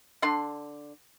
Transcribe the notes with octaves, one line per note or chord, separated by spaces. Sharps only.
D3 D4 C6